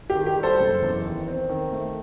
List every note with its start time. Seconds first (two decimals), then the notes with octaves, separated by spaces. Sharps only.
0.10 G4
0.15 D#3
0.26 G4
0.38 G3
0.43 A4 C5
0.60 F#1
0.82 E2
1.05 D#3
1.28 C4
1.49 D#3
1.72 A3